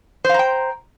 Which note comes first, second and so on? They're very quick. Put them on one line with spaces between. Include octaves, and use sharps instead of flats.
C5 F5 A#5 G5